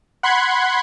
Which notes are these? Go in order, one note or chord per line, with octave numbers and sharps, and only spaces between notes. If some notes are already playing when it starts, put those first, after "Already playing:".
F#5 B5 C6 F#6 G#6